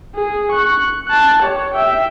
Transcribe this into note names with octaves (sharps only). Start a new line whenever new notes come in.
G#4
C#6 F#6
A5 F#6
G4 C#5
E5 G5